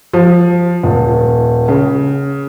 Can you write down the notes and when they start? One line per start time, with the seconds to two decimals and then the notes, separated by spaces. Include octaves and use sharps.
0.14 F3
0.84 D#1
1.68 C#3